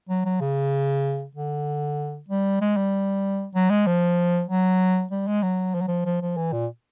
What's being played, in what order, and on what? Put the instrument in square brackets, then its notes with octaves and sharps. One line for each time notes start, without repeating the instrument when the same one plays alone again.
[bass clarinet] F#3
F#3
C#3
D3
G3
G#3
G3
F#3
G#3
F3
F#3
G3
G#3
F#3
F3
F#3
F3
F3
F3
E3
A#2